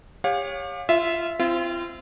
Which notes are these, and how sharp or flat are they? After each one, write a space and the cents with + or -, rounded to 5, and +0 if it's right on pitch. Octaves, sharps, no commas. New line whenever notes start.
G4 +30 C#5 +0 F5 +35
F4 -20 E5 +0
C4 +0 F4 -35